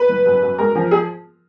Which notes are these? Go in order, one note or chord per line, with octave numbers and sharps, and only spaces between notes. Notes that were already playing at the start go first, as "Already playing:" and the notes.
Already playing: B4
F#1
F#2
F#2
G#3 A#4
F3
G#4